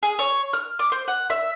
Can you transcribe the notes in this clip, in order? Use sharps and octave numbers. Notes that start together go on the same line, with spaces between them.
G#4
C#5
F6
D6
C5
F#5
E5